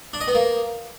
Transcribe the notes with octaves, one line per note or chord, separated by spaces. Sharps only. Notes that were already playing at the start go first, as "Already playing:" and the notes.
D4
D#5
B3
A#3